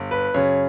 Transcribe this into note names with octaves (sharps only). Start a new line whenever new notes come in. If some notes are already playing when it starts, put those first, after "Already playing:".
Already playing: G1
B4
F#2 C#3 C#5